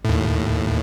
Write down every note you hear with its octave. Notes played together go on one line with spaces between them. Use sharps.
D#2 A2